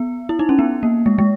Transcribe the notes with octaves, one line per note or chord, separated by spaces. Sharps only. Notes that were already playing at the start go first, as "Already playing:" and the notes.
Already playing: B3
E4
D#4
C#4
B3
A#3
G#3
G#3